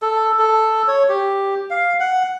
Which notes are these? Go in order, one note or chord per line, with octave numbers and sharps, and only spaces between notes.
A4
A4
C#5
G4
F5
F#5